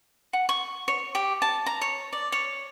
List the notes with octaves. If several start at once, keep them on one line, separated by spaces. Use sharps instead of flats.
F#5
C#6
C#5
G4
A5
A#5
C#5
D5
C#5